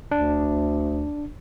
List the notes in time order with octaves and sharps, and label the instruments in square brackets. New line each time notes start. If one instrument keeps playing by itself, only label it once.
[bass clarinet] D2 [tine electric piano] D4